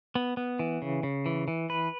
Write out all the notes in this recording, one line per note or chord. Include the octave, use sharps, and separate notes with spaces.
B3
B3
E3
C#3
C#3
E3
E3
B4